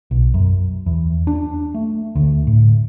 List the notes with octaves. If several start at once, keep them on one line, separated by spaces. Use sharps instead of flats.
B1
F#2
E2
D4
A3
D2
A2